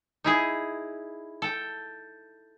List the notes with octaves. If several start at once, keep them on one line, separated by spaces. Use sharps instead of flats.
D#4 E4 G#4
A4 G5